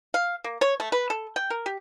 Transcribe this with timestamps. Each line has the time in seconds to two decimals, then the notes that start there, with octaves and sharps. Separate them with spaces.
0.14 F5
0.44 A#3
0.61 C#5
0.80 A3
0.92 B4
1.10 A4
1.36 G5
1.50 A#4
1.66 G4